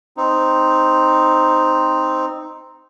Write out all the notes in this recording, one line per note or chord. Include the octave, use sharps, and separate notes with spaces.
C4 D#4